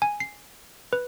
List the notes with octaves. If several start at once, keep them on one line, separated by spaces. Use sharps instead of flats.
G#5
C7
B4